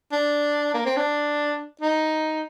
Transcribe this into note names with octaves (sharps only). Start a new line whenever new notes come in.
D4
A#3
C4
D4
D#4